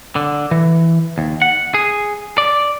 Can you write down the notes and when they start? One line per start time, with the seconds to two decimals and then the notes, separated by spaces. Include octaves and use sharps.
0.16 D3
0.51 E3
1.18 D#2
1.42 F#5
1.74 G#4
2.38 D5